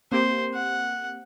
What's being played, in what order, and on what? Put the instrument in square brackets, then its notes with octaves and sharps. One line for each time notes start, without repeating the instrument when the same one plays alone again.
[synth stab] A#3 C4 G4 [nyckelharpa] C5
[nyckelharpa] F#5